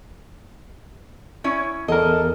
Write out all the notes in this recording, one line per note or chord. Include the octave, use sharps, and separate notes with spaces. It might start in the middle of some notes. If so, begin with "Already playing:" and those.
C#4 E4 C#5
E2 A4 A#4 D#5